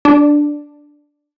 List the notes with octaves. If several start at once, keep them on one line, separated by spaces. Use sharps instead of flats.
D4